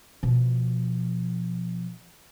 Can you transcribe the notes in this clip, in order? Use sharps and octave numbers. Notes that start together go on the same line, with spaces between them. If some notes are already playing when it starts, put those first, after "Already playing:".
B2 F3